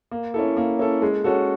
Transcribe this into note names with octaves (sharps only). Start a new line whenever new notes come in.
A#3
C#4 E4 A4
A#3
C#4 E4 A4
G#3
C#4 F#4 A4